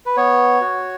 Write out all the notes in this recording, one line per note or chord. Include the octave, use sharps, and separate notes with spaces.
B4
B3 C#5
F#4